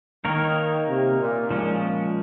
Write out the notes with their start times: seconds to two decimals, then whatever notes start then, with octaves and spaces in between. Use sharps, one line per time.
0.25 D#3 A#3 D#4 A#4 C#5
0.88 C3
1.20 A#2
1.50 A#2 F3 G#3 C#4